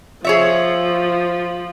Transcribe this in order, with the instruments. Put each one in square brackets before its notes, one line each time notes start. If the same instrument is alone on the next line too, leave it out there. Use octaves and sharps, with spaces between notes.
[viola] F3 [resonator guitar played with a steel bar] G#4 C#5 E5